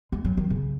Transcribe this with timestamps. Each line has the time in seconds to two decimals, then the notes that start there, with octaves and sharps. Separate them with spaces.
0.12 G#3
0.25 F#3
0.37 D#3
0.50 C#3